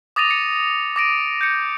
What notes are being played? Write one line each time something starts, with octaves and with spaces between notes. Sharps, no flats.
D6 D#6 A6 A#6 D#7 F7
C#7
D6 A#6 D7 D#7
G6 C#7